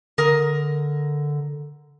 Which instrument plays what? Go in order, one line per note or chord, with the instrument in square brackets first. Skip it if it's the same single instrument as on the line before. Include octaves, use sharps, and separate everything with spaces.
[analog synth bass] D3 [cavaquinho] A#4 D#6